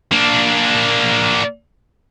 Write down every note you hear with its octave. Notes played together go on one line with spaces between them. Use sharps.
A#3 D4